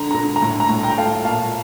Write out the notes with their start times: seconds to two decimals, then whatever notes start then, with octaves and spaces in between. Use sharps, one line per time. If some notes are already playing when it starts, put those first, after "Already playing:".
Already playing: D3 A#5
0.11 D3 A#5
0.36 A#5
0.42 A2
0.60 A#5
0.69 A2
0.83 G5 A#5
0.98 A3 F5 A5
1.24 A#2 F5 A5